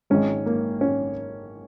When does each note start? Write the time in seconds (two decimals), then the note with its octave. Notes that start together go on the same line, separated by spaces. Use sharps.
0.10 G#1 G#2 G#3 C#4
0.46 A#3
0.81 C#4